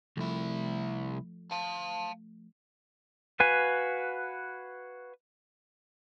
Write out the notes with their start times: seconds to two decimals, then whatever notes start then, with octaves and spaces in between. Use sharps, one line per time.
0.17 C2 F3 A3 E4
1.52 F5 A5
3.40 F#4 B4 F5 G#5